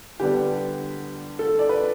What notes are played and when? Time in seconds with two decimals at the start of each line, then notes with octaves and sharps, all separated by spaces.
0.20 D3 G3 B3 D4 G4
1.39 A4
1.59 D5
1.69 B4